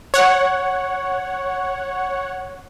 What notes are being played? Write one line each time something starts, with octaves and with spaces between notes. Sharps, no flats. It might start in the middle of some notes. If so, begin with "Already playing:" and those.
C#5 F#5